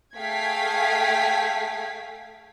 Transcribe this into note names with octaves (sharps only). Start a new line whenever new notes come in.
A3 G#4 F5 G5 G#6 B6